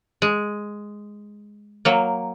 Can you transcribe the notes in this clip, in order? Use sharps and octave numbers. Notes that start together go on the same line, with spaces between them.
G#3
F#3 A#3